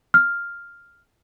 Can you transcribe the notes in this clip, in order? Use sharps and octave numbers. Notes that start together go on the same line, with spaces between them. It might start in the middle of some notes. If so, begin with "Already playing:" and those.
F6